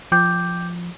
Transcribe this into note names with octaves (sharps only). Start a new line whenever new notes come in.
F3 G5 D6 G6